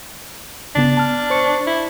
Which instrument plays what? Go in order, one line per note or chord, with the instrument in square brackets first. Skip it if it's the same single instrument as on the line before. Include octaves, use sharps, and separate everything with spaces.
[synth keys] G1 C#3 B3 [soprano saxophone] D4
[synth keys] A5 F6
C5 C#6 C#7
[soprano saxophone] E4